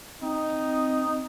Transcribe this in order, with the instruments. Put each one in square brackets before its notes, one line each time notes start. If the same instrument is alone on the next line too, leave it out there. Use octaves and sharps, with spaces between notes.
[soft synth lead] C4 [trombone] D#4